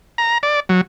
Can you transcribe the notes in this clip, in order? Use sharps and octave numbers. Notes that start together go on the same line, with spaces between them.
A#5
D5
F#3